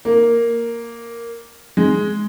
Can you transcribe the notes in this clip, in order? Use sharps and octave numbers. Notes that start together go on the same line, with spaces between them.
A#3
G#3